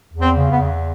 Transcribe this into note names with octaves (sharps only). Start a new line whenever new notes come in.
E2
C4
C#3
B3
E2